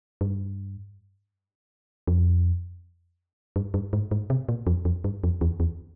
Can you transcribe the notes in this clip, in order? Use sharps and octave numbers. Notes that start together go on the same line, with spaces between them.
G2
F2
G2
G2
G#2
G#2
C3
A#2
F2
F2
G2
F2
E2
E2